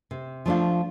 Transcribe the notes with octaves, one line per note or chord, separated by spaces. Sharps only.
C3
F3 A3 D4 F4